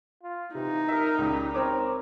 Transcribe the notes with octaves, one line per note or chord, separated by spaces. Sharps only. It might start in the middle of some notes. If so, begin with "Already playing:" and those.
F4
C3 E3 D#4
A#4 E5
C#2 G3
C4 A#4 C#5 D6